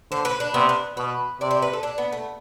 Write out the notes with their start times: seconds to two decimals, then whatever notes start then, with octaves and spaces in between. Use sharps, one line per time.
0.11 D3 C5
0.25 B4
0.40 D4
0.54 C3 B3
0.69 B3
0.97 B2 B4
1.40 C3 D5
1.51 C5
1.62 B4
1.73 A4
1.83 D4
1.98 B3
2.12 A3